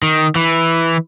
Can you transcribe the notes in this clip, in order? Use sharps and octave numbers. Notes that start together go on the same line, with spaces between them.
D#3
E3